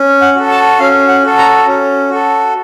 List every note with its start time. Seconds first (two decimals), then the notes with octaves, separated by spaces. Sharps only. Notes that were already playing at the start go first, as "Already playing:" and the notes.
Already playing: C#4
0.22 F#5
0.35 F#4 A4
0.51 A5
0.80 C#4 F5
1.08 F#5
1.23 F#4 A4
1.38 A#5
1.66 C#4
2.10 F#4 A4